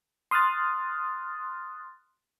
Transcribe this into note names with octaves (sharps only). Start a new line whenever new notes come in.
C6 D#6 F6 F#6 A6